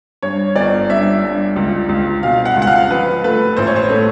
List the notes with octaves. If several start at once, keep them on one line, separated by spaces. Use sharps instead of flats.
G2 C#5
G1 D5
G2 E5
G2
C#2
C#2
B2 F5
F#5
C#2
F#5
F5
F3 B4
A3 B4
A1 C5
C#5
C5
A3